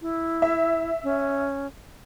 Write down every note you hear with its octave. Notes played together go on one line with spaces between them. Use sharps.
E4
E5
C#4